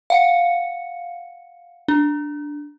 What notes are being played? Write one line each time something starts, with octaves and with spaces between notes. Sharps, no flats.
F5 F#5 C#7
D4